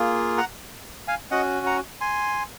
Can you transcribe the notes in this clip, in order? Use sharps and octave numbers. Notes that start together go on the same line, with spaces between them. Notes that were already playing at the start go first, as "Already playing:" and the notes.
Already playing: A#3 F4 G#4
F#5 A#5
F5 G#5
C#4 F#4 D#5 F#5
F#5 A#5
G#5 C6